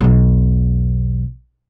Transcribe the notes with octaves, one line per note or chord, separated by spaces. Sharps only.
B1 E2